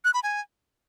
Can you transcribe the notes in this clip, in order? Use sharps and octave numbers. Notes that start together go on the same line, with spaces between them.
F#6
B5
G#5